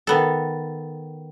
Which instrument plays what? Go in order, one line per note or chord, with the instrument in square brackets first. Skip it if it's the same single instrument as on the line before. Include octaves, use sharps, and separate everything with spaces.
[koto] D#3 B3 A4